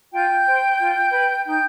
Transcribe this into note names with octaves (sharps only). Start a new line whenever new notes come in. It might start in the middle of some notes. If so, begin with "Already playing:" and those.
F4 G5 G6
C5
F4
B4
D#4 G5 G6